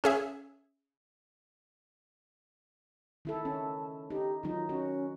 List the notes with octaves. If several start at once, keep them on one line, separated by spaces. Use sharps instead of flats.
C#4 G#4 E5
D#3 E4 A4
C#4 A5
D#4 G4
D#3 F#3 D#4 F4
C#4 F#4